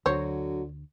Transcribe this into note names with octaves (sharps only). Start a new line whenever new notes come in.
D2 D3 F#3 F#4 C5 C#5